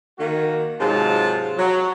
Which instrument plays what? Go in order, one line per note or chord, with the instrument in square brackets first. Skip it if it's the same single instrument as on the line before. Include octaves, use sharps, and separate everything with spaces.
[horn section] D#3 A#3 F#4
G#2 C3 F#3 G#3 F4 A5
F#3